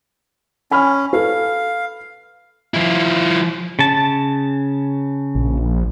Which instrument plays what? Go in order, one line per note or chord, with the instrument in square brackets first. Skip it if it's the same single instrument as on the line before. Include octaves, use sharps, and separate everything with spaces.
[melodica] C#4 [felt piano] G#5 B5 F6
[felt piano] A4 B4 [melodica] F5
[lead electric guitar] F3 E4
[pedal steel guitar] C#3 A5
[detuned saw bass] A#1